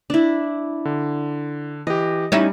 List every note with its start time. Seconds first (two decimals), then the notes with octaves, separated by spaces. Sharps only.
0.10 D4 E4
0.85 D3
1.87 E3 G4 D#5
2.32 G3 C#4 D#4 E4